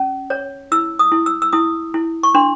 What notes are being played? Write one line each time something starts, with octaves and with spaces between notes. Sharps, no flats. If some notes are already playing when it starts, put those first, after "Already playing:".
Already playing: C#4
C#5
E4 E6
D#6
E4
E6
E6
E4 D#6
E4
C#6
D4 C6